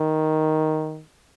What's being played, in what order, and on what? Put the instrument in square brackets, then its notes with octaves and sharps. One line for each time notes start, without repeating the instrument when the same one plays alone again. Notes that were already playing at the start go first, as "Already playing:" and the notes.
Already playing: [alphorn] D#3